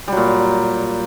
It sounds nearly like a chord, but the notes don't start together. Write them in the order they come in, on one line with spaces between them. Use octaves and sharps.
G3 F#3 A#2